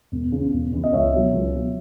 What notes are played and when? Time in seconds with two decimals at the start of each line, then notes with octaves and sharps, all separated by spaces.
0.12 E1
0.32 E2 C#3
0.53 E1
0.73 E2 C#3
0.84 D#5
0.93 C#2 C#5 E5
1.13 B2 F#3
1.33 C#2
1.54 B2 F#3